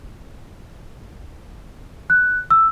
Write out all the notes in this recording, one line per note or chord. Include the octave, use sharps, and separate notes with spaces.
F#6
E6